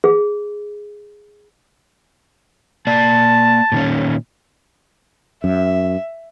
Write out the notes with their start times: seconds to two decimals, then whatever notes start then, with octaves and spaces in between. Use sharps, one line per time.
0.04 G#4
2.87 A#3 D5 A5
3.72 A#2 D#3 C#4
5.44 F#2 E5